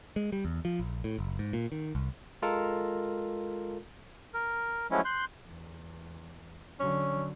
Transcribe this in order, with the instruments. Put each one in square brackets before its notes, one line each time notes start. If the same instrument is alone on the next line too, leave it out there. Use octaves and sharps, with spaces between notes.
[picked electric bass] G#3
G3
E2
F3
A#1
A2
F#1
G#2
A#2
D#3
C2
[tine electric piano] G#3 F4 A4 A#4
[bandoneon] A#4
F3 F#3 G#3 A3 C#4 E4
C6 F#6 G6
[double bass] E2
[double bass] D3 F#3 [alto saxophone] C#4